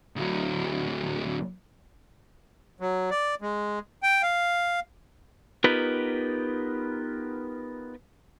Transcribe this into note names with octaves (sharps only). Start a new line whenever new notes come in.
D2 F#3
F#3
D5
G#3
G5
F5
B3 D#4 F4 G4 A#4 B4